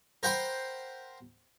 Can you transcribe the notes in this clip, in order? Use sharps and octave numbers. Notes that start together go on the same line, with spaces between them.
A#4 C5 F#5 G5 B5 C6